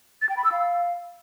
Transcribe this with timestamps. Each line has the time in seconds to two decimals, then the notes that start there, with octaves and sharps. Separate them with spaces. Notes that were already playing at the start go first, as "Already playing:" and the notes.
0.22 A6
0.29 G5
0.37 B5
0.44 E6
0.52 F5